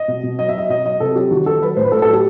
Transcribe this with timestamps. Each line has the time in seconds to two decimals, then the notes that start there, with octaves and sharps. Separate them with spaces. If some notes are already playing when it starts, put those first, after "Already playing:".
Already playing: D#5
0.08 B2
0.23 B2
0.39 F#3 D#5
0.49 E5
0.54 F#3 D#5
0.69 B2 D#5
0.85 F#3 D#5
1.00 C3 A4
1.16 F#3 G4
1.31 D#3 F#4
1.46 D#3 A4
1.61 F#3 B4
1.76 A2 C5
1.85 B4
1.92 A2 A4
2.02 A4
2.08 F#3
2.13 G4